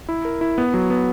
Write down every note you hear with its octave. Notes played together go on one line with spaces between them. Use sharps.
E4
A#4
E4
B3
F#3
B3